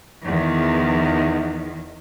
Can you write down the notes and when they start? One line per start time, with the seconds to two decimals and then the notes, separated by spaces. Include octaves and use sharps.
0.23 E2 D#3